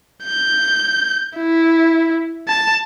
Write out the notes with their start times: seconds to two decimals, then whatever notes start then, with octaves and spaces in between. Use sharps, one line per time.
0.24 G6
1.38 E4
2.48 A5